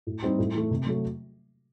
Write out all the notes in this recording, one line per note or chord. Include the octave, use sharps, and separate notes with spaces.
A2
G3 C4 D#4
A2
E3 A3
C3
F#3 A3